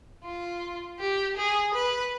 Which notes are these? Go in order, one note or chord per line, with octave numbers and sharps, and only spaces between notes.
F4
G4
G#4
B4